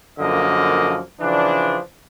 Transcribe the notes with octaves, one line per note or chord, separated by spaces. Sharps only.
F#2 D3 F3 A#3 D#5
C#3 E3 F3 D4